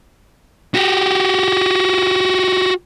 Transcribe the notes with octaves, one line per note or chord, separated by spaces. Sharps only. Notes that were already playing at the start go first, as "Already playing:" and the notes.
F#4 G4